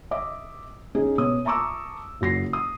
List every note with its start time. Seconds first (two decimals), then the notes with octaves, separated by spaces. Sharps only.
0.11 D#5 E5 D6
0.95 C#4 D#4 G#4
1.18 B2 C#5 D#6
1.45 E5 A5 A#5 C#6 D6 E6
2.21 F#1 F#3 A#6 C7
2.53 D#6